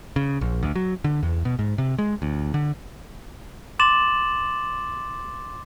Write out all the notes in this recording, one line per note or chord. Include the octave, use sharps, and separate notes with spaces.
C#3
A#1
D2
F#3
D3
E2
B2
G#2
C3
G#3
D2
D3
C6 D6 A6 E7 F#7